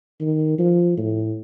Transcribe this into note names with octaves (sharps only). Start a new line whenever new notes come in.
D#3
F3
A2